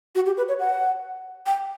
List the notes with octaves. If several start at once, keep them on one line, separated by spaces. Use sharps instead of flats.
F#4
G4
B4
C#5
F#5
G5